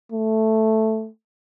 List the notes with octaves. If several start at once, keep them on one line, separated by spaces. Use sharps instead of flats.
A3